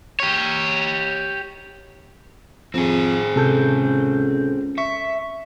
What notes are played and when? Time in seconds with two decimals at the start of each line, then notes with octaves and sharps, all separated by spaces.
0.20 G4 C#5
2.74 F2 C4 G#4
3.36 C#2 C3 A4 G6
4.78 E5 C#6